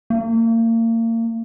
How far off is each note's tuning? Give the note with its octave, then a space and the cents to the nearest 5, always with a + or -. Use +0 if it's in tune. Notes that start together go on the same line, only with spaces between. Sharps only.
A#3 -35